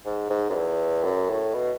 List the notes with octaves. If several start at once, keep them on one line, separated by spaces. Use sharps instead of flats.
G#2
G#2
F#2
E2
F#2
A2
B2